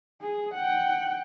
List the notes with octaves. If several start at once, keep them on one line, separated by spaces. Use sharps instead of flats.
G#4
F#5 G5